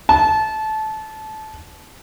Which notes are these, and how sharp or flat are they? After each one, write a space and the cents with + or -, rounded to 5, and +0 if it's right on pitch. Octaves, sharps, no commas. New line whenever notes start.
A5 -20